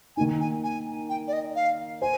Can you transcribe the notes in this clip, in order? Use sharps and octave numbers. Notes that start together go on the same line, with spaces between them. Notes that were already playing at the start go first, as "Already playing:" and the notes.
D#3 A#3 D#4 G#5
G#5
G#5
G5
D5
D#5
F5
C5 G#5